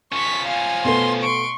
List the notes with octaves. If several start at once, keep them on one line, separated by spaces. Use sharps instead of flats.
F3 C#4 C#6 B6
F5 G#5
B2 A3 B3 C6
C6 C#6 D7